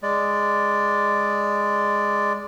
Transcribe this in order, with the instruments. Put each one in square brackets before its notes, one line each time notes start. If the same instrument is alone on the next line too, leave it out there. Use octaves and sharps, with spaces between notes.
[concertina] G#3 D5